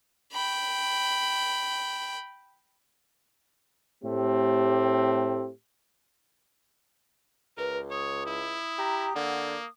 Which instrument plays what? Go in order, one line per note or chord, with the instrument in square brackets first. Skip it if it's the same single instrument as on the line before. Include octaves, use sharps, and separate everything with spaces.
[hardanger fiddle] G5 B5
[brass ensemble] A2 A3 C4 G4
[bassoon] C#2 [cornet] A#4 [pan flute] B4
[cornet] C#5 [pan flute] D#6
[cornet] E4
[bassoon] G4 [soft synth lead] A#5
[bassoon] D3 [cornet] A#3 [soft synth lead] F#5